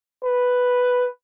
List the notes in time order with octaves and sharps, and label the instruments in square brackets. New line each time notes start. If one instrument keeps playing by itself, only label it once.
[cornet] B4